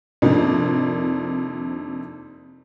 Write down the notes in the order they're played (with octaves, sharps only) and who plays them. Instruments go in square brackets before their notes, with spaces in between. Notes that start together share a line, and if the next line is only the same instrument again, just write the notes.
[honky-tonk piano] F2 C3 D#3 A#3 D4